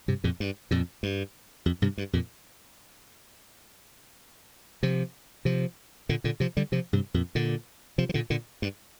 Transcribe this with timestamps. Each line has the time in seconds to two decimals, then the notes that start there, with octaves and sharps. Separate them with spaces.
0.08 G2 C3
0.24 F2 A#2
0.40 G2
0.71 F2 A#2
1.03 G2
1.66 F2
1.82 G2 C3
1.98 G2
2.13 F2 A#2
4.83 C3 F3
5.45 C3 F3
6.09 A#2 D3
6.24 A#2 D3
6.40 C3 F3
6.57 D3 G3
6.72 C3 F3
6.93 G2 C3
7.14 F2 A#2
7.35 A#2 D3
7.98 C3 F3
8.09 F3
8.14 A#2 D3
8.30 A#2 D3
8.62 G2